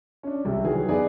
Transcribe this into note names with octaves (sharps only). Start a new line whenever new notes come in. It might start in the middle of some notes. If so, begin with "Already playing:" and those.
C#4 D4
C2 C3
D#3 E3 F#3 G#4
E2 D#4 G#4 B4 D5